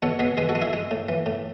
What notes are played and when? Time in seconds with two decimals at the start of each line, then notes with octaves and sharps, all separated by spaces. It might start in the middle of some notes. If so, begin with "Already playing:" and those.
0.02 B2 A4 C#5
0.19 B2 G#4 B4
0.37 G#3 G#4 B4
0.49 F#4 A4
0.55 G#3
0.62 E4 G#4
0.73 G#3
0.91 A2
1.09 E3
1.26 A2